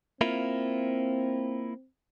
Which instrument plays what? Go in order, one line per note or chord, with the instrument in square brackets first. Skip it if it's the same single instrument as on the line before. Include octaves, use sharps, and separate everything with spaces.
[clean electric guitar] A#3 E4 F4 [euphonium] C4